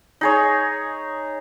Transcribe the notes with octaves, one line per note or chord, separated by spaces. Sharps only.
D#4 G#4 C#5